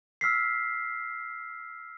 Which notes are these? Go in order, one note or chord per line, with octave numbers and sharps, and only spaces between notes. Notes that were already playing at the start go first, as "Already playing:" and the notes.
E6 F6 B6 C7